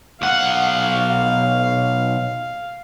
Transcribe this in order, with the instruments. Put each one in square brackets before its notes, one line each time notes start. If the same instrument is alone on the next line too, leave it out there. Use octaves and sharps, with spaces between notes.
[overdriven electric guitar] B1 F#5 [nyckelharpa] F5